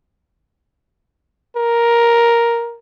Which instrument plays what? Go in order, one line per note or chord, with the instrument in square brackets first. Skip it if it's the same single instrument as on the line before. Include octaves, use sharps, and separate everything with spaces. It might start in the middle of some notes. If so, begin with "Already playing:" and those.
[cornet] A#4